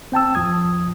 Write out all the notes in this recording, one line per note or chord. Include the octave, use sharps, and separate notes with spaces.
C4 G5 A5 E6
E2 F3 D#6 G#6